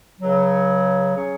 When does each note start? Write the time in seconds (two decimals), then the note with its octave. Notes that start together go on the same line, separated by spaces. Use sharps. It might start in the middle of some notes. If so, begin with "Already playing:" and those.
0.20 C#2 C#3 F#3
1.15 F#3 C#4 G#4 C#5